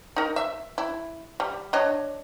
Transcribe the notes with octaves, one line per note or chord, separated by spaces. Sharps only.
D#4 A#4
E5
E4
G3
D4 C#5 D#5